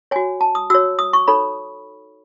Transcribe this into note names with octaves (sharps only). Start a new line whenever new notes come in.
F#4 C#5 G#5
A5
D#6
F#4 C#5 E6
D#6
C#6
D#4 A4 C#5 B5